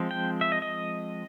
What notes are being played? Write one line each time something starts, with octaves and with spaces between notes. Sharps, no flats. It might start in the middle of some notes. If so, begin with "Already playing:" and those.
Already playing: F3 G#3 C4
G5
E5
D#5
D#5